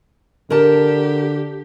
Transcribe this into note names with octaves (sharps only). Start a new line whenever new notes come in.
D3 G4 A#4 A5